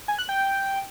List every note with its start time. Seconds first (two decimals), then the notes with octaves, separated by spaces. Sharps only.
0.08 G#5
0.19 F#6
0.29 G5